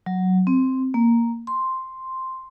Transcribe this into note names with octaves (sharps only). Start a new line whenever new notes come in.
F#3
C4
A#3
C6